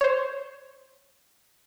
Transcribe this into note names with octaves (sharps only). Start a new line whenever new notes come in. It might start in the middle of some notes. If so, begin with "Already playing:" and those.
C5 C#5